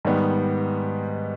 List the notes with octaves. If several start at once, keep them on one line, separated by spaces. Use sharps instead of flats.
G#2 D#3 G3 B3